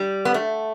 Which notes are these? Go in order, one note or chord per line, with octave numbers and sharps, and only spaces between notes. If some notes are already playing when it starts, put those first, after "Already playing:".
Already playing: G3
B3
A3